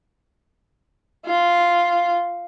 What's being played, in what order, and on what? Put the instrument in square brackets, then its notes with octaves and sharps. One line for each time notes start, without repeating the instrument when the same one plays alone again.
[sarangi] F4